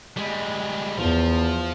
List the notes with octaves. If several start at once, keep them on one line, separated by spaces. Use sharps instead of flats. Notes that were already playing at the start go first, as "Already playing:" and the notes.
G3 G#3
E2 F3